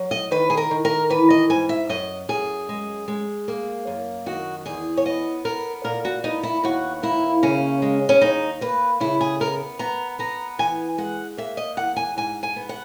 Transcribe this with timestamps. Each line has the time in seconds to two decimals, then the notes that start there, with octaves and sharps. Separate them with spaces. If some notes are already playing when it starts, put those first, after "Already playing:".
Already playing: F#3
0.11 D#5
0.31 D#3 B4
0.50 G#4
0.57 A#4
0.71 D#3
0.85 A#4
1.10 E3 B4
1.30 D#5
1.50 G#2 G#5
1.69 E5
1.89 F#2 D#5
2.29 F#2 G#4
2.69 G#3
3.08 G#3
3.48 A#3
3.87 F#2
4.26 D#3 F#4
4.66 E2 G#4
4.97 C#5
5.05 B3 D#5
5.45 B3 A#4
5.84 A#2 A#4
6.05 F#4
6.24 B3 D#4
6.43 E4
6.64 D#2 F#4
7.03 A#3 E4
7.43 C#3 C#4
7.82 G#3
8.09 C#4
8.21 D#2 D#4
8.61 A#3 B4
9.00 C#3 E4
9.21 G#4
9.40 B3 A#4
9.79 B3 A#5
10.19 B3 A#5
10.59 E3 G#5
10.98 G#3 F#5
11.37 A#3 E5
11.57 D#5
11.77 E2 F#5
11.96 G#5
12.17 G#2 G#5
12.43 G#5
12.56 B3
12.69 F#5